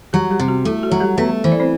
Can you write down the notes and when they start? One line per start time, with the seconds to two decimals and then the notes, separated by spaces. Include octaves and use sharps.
0.13 F#3 G3 G4
0.31 G3 G4
0.40 C3
0.48 F#4
0.65 A3 E4
0.83 F#4
0.91 F#3
1.01 G3 G4
1.18 A3 B3 B4
1.44 E3 C5
1.52 D5
1.60 C4 C5